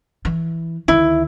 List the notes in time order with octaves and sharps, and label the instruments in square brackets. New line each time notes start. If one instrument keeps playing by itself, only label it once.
[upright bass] E3
[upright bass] D2 D#3 [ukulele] E4